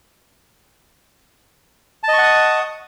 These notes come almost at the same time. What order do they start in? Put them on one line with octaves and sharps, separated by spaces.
A5 D#5 C#6 F#5 D#6